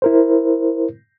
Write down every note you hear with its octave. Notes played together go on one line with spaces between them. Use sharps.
E4 A#4 C5